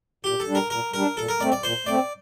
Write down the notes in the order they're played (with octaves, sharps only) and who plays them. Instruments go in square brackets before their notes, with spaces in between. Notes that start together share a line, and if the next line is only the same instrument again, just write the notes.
[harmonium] A#2 [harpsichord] G4
[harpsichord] A4
[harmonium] G3 D4
[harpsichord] A#4
[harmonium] A#2 [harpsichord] A#4
[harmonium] G3 D4 [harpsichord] A#4
[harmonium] A#2 [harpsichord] A4
[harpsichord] A#4
[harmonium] A3 C4 [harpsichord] D5
[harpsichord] D5
[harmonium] A#2 [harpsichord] C5
[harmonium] A3 C4 [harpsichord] D5